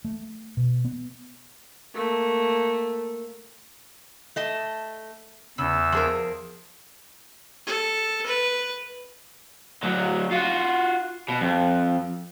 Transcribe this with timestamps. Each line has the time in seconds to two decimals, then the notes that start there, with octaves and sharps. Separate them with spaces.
0.05 A3
0.57 B2
0.85 B3
1.95 A3 A#3
4.36 A3 D#5 A5
5.58 E2 C#3 E6
5.92 F3 G#4 A#4
7.66 A4
8.26 B4
9.83 D2 F#3
10.31 F4 F#4
11.29 B2
11.41 F2